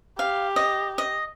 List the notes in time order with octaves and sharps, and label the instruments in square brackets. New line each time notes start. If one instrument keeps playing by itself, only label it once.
[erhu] G4 [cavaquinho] F5
[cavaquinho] D#5
D#5